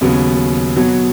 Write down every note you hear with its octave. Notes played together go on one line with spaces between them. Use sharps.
D#2 C#3 F#3 B3
B2 F#3 B3 F#4 C#5